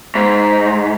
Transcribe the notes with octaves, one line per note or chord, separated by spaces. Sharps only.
G#2